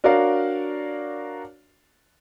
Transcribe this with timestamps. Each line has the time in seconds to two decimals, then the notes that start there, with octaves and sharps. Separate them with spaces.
0.04 D4 F#4 A#4 C#5 D5 F5